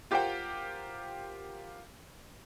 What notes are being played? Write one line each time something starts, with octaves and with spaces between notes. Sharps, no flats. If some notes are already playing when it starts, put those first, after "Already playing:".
F4 G4 A#4 C5 F#5 G5